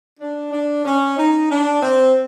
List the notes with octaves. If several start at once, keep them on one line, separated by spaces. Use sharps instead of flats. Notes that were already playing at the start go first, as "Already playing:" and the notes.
D4
D4
C#4
D#4
D4
C4